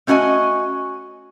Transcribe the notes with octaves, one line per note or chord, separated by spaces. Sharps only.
A3 C#4 F#4 D#5 G#5